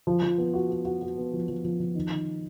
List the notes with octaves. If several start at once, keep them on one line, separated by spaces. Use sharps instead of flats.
F3
F3
B3
F#4
B3
F#4
F#4
B3
F3
F3
F3
F3
D#3
D#3